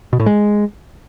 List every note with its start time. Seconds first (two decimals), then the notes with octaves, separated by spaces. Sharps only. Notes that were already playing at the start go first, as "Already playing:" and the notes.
0.13 B2
0.20 A2
0.26 G#3